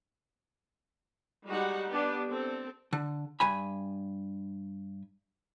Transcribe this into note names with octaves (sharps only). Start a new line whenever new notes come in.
G3 G#3 D#4 F#4 G4 F#5
B3 D4 G4
C4 A4
D3
G2 G#5 B5